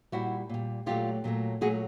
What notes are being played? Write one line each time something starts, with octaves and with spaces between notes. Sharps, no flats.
A#2 G3 E4 F#4
A#2 G3
A#2 F#3 A3 F4 G4
A#2 F#3 A3
A#2 F#3 A3 F#4 G#4